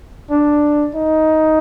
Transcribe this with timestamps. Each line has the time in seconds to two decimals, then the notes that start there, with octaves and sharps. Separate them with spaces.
0.30 D4
0.95 D#4